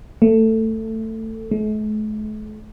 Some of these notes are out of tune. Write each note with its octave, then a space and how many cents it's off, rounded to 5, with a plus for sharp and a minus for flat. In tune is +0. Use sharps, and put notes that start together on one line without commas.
A3 +15
A3 -45